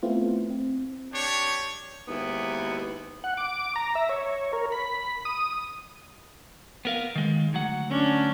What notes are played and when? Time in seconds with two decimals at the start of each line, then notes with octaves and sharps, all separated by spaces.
0.03 A3 B3 C4 E4 F4
0.50 C4
1.13 D4 G4 C#5
2.08 D#2 G#2 B3 E4
3.24 F#5
3.37 D6
3.76 A#5
3.95 E5
4.09 C#5
4.53 A#4
4.72 B5
5.25 D#6
6.85 B3 A#4 F5
7.15 D#3 G#3
7.53 D2 F#3 F#5
7.91 C#4 D4